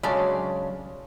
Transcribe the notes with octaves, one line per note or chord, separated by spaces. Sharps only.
C#3 F#3 G#3 C#4 D4 A4 C#5 D5